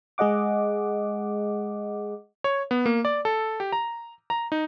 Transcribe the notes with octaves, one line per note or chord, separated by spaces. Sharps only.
G#3 G#4 D#5 F#5 D6
C#5
B3
A#3
D5
A4
G4
A#5
A#5
D#4